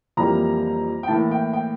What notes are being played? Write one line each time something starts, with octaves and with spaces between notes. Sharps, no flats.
F2 E3 G3 A#3 A#5
G5
A2 E3 A#3 A5
G5
G5